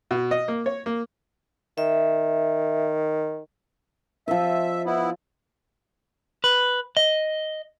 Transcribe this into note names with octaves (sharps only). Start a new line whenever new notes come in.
B2
D#5
A#3
C#5
A#3
D#3 E5
F3 D#5 E5
B3 E4
B4
D#5